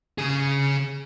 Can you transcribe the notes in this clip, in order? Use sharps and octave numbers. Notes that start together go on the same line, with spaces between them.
C#3 G#4